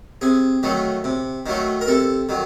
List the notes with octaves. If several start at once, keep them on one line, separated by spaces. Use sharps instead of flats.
C3 G#4
D#3 F#3 A3
C3
D#3 F#3 A3
A#4
C3 A4
D#3 F#3